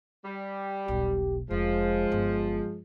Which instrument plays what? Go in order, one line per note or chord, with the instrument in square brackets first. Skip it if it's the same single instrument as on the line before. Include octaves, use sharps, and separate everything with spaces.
[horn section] G3
[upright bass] E1 B1 [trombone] G4
[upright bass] F1 [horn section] F3 [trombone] G#3
[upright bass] G1